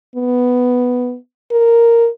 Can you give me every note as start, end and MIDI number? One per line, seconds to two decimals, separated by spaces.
0.16 1.17 59
1.52 2.08 70